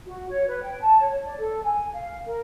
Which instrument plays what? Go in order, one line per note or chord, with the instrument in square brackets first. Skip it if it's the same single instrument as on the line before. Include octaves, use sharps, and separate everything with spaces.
[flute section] F#4
C#5
B4
G5
A5
C#5
D5
A4
G#5
F5
A#4